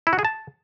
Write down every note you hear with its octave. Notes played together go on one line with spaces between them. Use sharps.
E4
F#4
G#4
A5